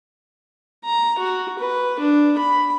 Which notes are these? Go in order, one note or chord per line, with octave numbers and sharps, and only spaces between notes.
A#5
F#4
B4
D4
B5